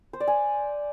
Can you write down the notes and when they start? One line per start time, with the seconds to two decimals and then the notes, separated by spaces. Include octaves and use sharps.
0.13 C5
0.20 D5
0.28 G#5